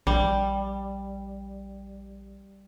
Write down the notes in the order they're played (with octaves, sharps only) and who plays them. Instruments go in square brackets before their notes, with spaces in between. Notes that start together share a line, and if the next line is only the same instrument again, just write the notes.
[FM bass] A#1 [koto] G3